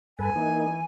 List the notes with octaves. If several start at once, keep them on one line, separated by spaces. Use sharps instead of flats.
G2 A4 B4 G#5
E3 A#3 D#4